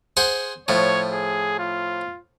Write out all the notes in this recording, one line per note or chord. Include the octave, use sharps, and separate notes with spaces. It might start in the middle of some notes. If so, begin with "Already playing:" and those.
G#4 C5 F#5
A2 F3 C#5
G#4
F4